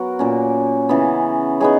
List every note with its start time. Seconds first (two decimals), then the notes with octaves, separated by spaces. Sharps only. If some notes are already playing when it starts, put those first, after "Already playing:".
Already playing: F#3 B3 F#4 A#4
0.19 A#2 A#3 C#4
0.89 C#3 E3 B3
1.60 B3 D#4 G#4 C#5